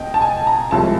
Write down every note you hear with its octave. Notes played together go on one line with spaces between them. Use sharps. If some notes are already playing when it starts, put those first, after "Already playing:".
Already playing: C#2 B2 D#5 G5
A5
G#5
A#5
C2 C3 F3 G#3 C#4 A5